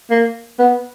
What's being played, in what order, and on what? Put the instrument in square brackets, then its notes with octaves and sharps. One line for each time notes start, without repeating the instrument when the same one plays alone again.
[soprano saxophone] A#3
B3